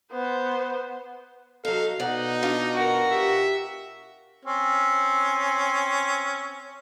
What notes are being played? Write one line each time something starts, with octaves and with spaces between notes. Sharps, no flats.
B3 C5
F#3 D#4 A4 F5
B2 D#4 D5 F#5
D4 F4
F#4 A#4
G4 E5
C4 C#4